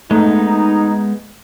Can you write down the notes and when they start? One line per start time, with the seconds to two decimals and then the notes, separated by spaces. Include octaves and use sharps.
0.11 G#3 A3 B3 D#4